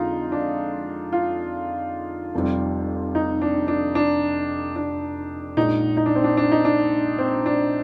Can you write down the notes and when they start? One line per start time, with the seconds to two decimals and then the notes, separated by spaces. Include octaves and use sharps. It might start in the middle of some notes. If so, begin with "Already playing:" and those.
Already playing: F2 D3 G#3 D#4 F4
0.32 D4
1.12 F4
2.35 F1 F2 C3 G3
3.15 D#4
3.42 D4
3.68 D4
3.95 D4
4.76 D4
5.57 A#1 A#2 G#3 D#4
5.97 D#4
6.06 D4
6.15 C4
6.24 D4
6.37 D4
6.52 D#4
6.65 D4
7.18 C4
7.46 D4